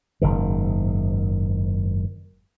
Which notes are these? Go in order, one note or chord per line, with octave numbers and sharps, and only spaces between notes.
F#1 G#2 D#3